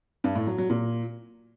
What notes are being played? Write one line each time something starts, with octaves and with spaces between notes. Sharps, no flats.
G2
A2
F#3
F#3
A#2